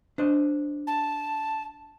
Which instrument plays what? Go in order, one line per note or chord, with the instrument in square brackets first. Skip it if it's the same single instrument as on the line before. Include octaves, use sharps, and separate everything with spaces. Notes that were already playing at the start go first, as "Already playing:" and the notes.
[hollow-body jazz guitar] D4 C5 D#5
[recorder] A5